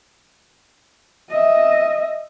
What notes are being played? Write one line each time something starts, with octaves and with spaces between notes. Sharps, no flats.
D#5 E5